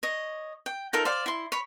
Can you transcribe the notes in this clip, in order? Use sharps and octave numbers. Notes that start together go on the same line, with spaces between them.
C#5 D#5
G5
D#4 F4 A4 A#4
C5 D5 F5
E4 C6
C#5 B5